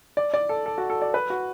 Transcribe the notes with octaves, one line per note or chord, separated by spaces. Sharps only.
D5
D5
A4
A4
F#4
A4
D5
B4
F#4